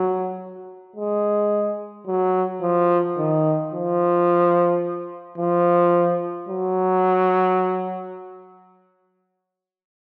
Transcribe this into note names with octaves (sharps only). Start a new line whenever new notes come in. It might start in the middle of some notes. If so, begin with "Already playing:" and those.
Already playing: F#3
G#3
F#3
F3
D#3
F3
F3
F#3